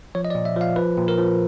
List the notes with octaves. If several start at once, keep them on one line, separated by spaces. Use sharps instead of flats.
F3 C#5
D#5
D5
A#2
E5
F3 F5
F3 B4
A#2
A#4
F3